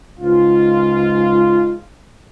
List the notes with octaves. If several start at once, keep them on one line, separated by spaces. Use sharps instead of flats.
C#2 G#2 F4